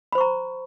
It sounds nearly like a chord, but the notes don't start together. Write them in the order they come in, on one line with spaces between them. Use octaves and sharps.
B5 C5 C#6 A#5